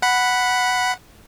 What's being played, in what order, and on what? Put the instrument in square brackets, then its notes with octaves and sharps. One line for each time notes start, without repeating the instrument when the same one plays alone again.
[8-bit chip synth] F#5 B5